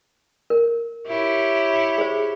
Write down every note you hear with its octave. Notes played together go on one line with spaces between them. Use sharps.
A#4
E4 G4 C#5
G#4 C5